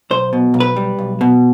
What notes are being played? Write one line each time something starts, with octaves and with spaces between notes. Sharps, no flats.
B1 C5
B2
B1
B4
G3
B1
B2